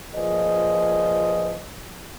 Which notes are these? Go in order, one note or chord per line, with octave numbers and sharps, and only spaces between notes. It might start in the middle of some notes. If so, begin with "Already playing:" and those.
A#2 F3 G#4 B4 D#5